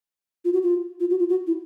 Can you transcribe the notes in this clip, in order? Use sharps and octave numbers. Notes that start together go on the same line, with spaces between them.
F4
F#4
F4
F4
F#4
F4
F#4
E4